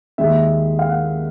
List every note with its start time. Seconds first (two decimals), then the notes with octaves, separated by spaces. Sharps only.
0.18 D#2 D#3 G#3 E5
0.79 F5
0.89 F#5